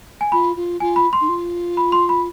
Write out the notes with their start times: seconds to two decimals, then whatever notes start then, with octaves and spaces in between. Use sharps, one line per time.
0.21 G#5
0.32 F4 B5
0.56 F4
0.80 F4 G#5
0.96 B5
1.13 C6
1.21 D#4
1.29 F4
1.77 B5
1.92 C6
2.09 B5